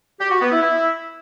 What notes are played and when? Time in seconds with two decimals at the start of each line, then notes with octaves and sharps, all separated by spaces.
0.19 G4
0.30 F#4
0.40 B3
0.51 E4
0.61 E4